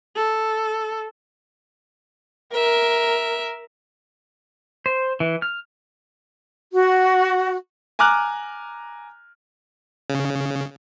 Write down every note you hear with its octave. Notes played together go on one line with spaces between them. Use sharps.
A4
A#4 E5
C5
E3
F6
F#4
G#5 A#5 D6 F6 F#6
C#3